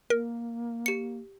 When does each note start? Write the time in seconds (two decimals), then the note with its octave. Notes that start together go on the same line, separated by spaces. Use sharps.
0.10 A#3 A#4
0.86 G4 C#7